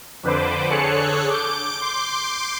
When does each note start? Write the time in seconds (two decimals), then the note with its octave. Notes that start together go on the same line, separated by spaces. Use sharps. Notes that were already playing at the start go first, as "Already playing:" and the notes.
0.23 F2 D3 B4 C5 D6
0.70 D3 G#4 A4 C#5 F#6 C#7
1.30 D6 G6 D7
1.81 C6 D6 G6